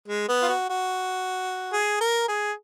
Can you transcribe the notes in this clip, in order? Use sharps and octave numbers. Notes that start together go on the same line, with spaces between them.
G#3
B3
F4
F#4
F#4
G#4
A#4
G#4